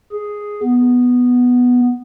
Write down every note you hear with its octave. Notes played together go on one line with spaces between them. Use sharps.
G#4
B3